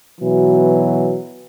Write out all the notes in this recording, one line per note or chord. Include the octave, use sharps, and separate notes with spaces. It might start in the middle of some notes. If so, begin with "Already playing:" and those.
B2 E3 F#3